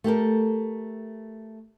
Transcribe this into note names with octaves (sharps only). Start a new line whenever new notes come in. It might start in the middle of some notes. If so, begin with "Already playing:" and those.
A3 G4 A4 A#4